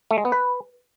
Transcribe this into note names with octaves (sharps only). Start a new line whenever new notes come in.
A3
G#3
B3
B4